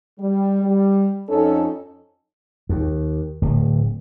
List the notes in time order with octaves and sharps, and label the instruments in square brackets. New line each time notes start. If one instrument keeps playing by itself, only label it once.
[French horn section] G3
G3
F2 C#4 D#4 A4
[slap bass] D#2
D1